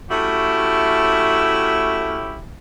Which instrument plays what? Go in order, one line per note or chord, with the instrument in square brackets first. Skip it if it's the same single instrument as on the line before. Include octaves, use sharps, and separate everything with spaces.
[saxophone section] A3 C#4 E4 F#4 G4